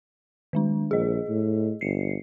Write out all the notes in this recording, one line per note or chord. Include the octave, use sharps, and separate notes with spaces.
D#3 G#3 D4
A#1 G#4 D#5
A2
G1 C7 C#7